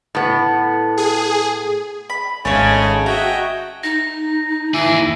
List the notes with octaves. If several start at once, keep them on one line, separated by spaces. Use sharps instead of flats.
A2 B3
G#4
B5
G#1 C#3 G#3 A3 C#4 G#4 C#5 G#5
F#4 D#5 E5 G5 G#5 A#5
D#4 A#6
D#2 E3 G#4